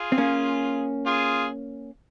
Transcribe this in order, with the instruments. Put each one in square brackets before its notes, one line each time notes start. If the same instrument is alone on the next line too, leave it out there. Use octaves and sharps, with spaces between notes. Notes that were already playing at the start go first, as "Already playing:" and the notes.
Already playing: [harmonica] F4 G#4
[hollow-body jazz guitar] C4
A#3 C#4
[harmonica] F4 G#4